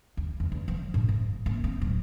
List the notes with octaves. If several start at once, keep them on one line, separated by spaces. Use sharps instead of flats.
D#2
E2
E2
F3
A2
G#2
A#3
C4
D1